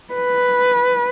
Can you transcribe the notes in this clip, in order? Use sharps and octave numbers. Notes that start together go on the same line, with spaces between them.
B4